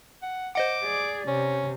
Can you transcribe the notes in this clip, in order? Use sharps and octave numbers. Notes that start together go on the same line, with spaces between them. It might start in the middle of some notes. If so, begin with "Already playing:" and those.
F#5
C5 D#5 F#5 D6
G#4 D5
C3 C#4